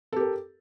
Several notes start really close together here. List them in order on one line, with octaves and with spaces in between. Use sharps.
A4 G4 A#4